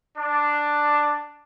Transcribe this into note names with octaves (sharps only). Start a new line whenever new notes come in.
D4